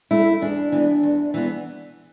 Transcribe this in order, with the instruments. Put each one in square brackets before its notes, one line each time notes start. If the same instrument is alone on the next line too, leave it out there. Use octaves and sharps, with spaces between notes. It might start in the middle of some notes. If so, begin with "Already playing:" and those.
[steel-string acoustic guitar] A3 E4
E2 D4
E3 B3
E2
E3 B3